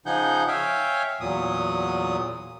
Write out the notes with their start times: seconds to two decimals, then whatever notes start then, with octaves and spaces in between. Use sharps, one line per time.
0.06 C#3 F3 D#4 G#4 F#5 G6
0.48 C#5 E5 F5 G5 G#5
1.21 E2 A#2 F#3 D#6